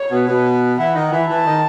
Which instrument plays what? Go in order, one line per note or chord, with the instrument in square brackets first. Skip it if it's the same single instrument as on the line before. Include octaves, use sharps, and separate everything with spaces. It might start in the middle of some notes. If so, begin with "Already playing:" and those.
Already playing: [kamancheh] C#5
[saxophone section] B2 B3
B2 B3
[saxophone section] E3 E4 [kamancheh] F#5
[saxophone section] D#3 D#4
E3 E4
[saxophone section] E3 E4 [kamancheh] A5
[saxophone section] D#3 D#4